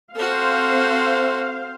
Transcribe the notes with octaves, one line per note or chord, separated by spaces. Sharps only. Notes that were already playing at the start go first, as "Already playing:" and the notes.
C4 F#4 A4 C5 F5